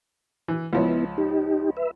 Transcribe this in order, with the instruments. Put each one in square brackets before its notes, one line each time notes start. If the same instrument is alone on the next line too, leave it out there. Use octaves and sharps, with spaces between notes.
[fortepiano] E3
[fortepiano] C#2 F3 C#5 [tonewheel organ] B3 E4
[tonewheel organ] D#4 G4
B4 E5